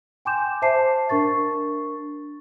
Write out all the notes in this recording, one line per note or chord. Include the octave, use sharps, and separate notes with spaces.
G5 G#5 C6 D6 G6 E7
C5 E5 A5 D6 C7
D4 A#4 C#6 A6